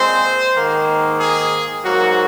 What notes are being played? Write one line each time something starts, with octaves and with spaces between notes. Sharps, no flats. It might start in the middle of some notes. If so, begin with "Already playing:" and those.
Already playing: A#2 G#3 C4 C5
G#2 D#3 A#3
G#4
G#2 F#3 A#3 F#4